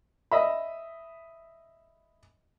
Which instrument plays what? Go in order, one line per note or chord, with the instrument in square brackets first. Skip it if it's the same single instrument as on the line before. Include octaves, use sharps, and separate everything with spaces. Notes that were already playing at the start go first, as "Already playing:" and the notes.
[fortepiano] D#5 E5 B5